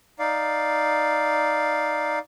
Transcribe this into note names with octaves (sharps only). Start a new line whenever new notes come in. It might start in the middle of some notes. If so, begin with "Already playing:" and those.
D#4 D5 F5